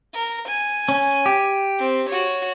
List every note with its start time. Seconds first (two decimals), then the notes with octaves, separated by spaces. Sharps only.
0.14 A#4
0.48 G#5
0.89 C#4
1.26 G4
1.79 C4
2.09 F#4 C#5